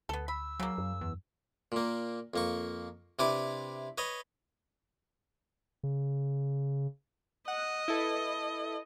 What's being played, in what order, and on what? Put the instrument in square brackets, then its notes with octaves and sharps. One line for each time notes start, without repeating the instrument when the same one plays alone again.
[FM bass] D2 [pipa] B3 A4
[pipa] B5 [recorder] E6
[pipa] C#3 A#3 [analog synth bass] F#3
[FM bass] F#2
[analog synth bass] E2
[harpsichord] A#2 A#3
F2 A#3 C#6
C3 D4 E4 B4 D6
B4 C#5 D#5
[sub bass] C#3
[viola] D#5 [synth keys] F#5
[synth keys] E4 A4 B4